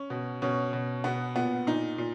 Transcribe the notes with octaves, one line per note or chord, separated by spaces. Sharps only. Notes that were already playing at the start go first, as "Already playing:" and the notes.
Already playing: C#4
B2
B2 C#4
B2
B2 B3
A#2 B3
A#2 D#4
A#2